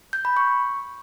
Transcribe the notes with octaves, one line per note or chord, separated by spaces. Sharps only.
G6
B5
C#6